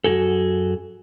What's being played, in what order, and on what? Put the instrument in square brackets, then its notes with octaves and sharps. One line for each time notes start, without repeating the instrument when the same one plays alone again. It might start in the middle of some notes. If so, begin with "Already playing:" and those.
[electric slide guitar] F#2 C3 F#4 G#4 A4